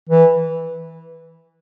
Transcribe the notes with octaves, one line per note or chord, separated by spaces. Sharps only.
E3